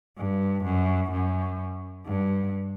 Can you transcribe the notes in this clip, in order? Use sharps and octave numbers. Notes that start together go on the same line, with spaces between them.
G2
F#2
F#2
G2